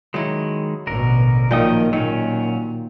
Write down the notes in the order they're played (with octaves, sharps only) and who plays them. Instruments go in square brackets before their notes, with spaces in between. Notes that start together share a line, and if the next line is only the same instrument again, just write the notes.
[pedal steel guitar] D#3 G#3 [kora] F#3 E4
[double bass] A1 B2 [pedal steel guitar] D3 A#4
[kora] A#2 D#3 F#3 [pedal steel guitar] F3 G5 D#6 [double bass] A#3
[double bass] A#2 [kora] D#3 [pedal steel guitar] F#3 C#4